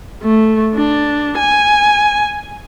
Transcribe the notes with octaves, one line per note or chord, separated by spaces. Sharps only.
A3
D4
G#5